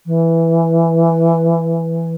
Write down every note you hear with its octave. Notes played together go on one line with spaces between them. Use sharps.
E3